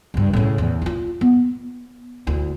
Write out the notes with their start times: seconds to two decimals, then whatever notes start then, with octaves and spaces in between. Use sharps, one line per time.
0.14 C#2 G2
0.33 A2 C#3
0.58 E2
0.82 E4 F4
1.21 B3
2.27 D2 E4